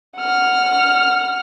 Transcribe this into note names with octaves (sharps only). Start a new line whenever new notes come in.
F#5 F6